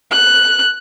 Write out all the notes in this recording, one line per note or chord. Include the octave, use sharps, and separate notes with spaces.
F#6